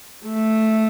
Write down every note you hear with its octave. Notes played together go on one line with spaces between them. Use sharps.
A3